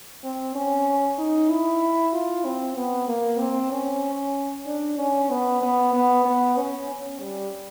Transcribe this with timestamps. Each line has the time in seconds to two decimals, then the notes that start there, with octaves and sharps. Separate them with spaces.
0.24 C4
0.55 C#4
1.18 D#4
1.50 E4
2.14 F4
2.45 C4
2.76 B3
3.08 A#3
3.40 C4
3.72 C#4
4.66 D4
4.98 C#4
5.30 B3
5.62 B3
5.93 B3
6.25 B3
6.57 C#4
6.88 C#4
7.20 G3